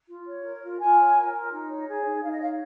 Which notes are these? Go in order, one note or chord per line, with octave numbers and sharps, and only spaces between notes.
F4
C#5
A#4
F4
F4 G#5
C#5
A#4
F4
D#4
C#5
G#4
D#4
D#4 F5
D#5
C#5 F5